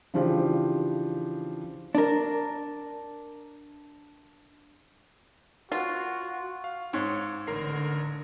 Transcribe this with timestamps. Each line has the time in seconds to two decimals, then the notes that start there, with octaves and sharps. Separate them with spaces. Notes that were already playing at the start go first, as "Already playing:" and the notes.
0.14 C#3 E3 F3 D4 F4 G4
1.95 D4 A#4
5.72 F4 F#4
6.64 F5
6.93 G#2 C#5 C#6
7.47 A1 D3 A#4 C7